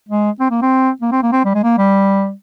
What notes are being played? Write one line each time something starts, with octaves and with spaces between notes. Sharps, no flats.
G#3
C4
A#3
C4
A#3
C4
A#3
C4
G3
G#3
A#3
G3